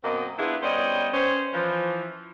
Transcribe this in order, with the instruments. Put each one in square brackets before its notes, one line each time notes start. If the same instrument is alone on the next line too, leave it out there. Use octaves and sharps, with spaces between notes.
[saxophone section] F#2 B2 A#3 C4 D#5
B3 D4 E4 F4 G#4 B4
G3 B3 C#4 C5 D5 D#5
C#4 C5
E3 F3